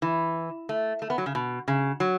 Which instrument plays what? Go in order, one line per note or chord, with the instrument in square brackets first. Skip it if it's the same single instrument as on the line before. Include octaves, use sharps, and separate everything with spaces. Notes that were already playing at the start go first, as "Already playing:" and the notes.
[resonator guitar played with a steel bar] E3
A3
A3
B3
F#3
C#3
B2
C#3
F#3